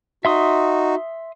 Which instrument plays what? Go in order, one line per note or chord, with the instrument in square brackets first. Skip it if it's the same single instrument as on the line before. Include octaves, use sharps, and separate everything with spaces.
[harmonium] D#4 F#4 [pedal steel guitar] E5 C6 D#6